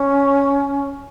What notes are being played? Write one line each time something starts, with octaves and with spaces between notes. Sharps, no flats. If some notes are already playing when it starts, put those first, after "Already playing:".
Already playing: C#4